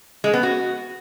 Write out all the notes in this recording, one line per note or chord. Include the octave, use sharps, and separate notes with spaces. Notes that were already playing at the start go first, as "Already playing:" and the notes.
G#3
B3
F#4